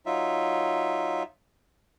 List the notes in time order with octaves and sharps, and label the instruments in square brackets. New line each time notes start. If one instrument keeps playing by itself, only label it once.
[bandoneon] F#3 D#4 F4 E5